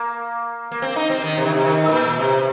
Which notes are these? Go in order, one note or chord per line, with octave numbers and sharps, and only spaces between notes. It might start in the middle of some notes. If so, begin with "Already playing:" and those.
Already playing: A#3
A#3
C4
D#4
C4
D#3
C3
D#3
C3
D#3
G#2
A#2
C3